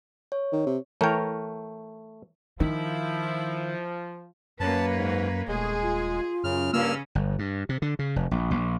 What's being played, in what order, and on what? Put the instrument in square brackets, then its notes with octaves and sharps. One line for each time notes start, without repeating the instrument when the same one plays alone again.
[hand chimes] C#5
[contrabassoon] D#3
C3
[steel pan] E3 A#4 C#5 [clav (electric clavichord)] A3 G5
[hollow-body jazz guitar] D#3 [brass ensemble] F3 [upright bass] D#4 [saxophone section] E4
[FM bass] F#2 [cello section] A#3 B4 C#5 [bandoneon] A5
[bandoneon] G#2
[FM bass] D#1 [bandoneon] G#3 [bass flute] A3 [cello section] G#4
[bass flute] F4
[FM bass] F#2 [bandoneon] C#3 F6
[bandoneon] G2 E6 F6 [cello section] C#3 C#4 [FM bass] A#3
[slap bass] G1
G2
C3
D3
C#3
F1
A#1
A#1